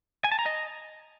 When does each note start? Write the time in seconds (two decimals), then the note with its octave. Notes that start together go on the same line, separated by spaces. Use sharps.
0.24 G#5
0.32 A5
0.39 A#5
0.46 D#5